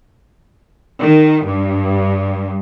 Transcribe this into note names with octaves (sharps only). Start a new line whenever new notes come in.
D#3
G2